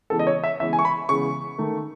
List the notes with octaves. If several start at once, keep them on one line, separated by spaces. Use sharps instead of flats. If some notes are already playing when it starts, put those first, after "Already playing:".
C#3 E3 G#3 B3 A4
D#5
C#5
E5
C#3 E3 G#3 B3 E5
G#5
C#6
B5
C#3 E3 G#3 B3 C#6
D#3 A3